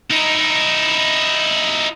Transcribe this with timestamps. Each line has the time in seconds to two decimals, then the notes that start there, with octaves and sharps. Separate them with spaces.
0.11 D#4 E4